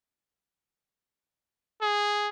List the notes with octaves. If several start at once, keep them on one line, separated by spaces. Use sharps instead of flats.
G#4